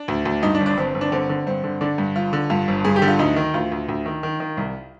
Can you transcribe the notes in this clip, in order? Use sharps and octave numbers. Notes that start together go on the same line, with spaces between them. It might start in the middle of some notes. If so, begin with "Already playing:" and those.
Already playing: D4
D2
D2
G2 D#4
D4
G1
D4
G1 C4
G1
D4
D3 C4
D3
G2 C4
D3
D3 D4
G2
G1 F4
D3
G2 F4
G1
G2 G#4
G4
D3
F4
D2 D#4
D#3
D2 F4
D2
D2
D#3
D#3
D#3
C2